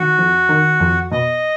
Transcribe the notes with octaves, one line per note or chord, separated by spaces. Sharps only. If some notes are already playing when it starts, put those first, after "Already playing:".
Already playing: D#3 F#4
F2
D#3
F2
B2 D#5